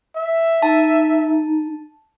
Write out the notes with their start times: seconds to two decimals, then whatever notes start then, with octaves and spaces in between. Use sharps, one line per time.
0.16 E5
0.62 D#4 A5